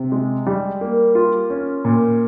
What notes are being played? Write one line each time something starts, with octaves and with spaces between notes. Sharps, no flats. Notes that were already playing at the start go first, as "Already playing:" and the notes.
Already playing: C3
G#3
G3
A#3
F4
C#4
A#2